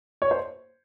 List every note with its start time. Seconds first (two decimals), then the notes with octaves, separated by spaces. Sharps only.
0.22 C#5
0.31 C5